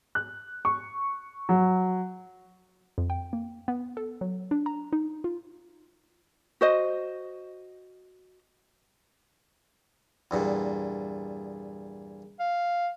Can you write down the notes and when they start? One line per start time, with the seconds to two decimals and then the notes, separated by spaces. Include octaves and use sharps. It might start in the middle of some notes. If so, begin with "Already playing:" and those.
0.15 F#6
0.65 C#6
1.49 F#3
2.98 F2
3.10 G5
3.33 A#3
3.68 B3
3.97 A4
4.21 F#3
4.51 D4
4.66 A#5
4.93 D#4
5.24 F4
6.61 F#4 C5 D#5
10.31 E2 G2 A#2
12.40 F5